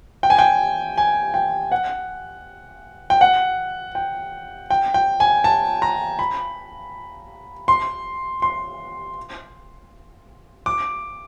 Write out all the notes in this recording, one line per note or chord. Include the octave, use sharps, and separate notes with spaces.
G5
G#5
G5
G#5
G5
F#5
G5
F#5
G5
G5
G5
G#5
A5
A#5
B5
C6
C6
D6